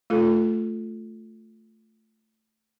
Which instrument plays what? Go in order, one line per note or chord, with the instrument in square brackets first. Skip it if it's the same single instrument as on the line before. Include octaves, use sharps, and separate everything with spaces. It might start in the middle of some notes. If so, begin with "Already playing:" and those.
[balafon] A3 F4 A4